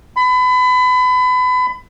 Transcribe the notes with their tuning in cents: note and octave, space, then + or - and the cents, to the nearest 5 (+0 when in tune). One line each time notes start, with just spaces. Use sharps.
B5 +30